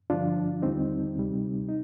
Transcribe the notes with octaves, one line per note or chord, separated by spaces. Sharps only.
G2 D3 F3 D4 F4
D#2 D3 G3 C4 D#4
D2 C3 G3
D#4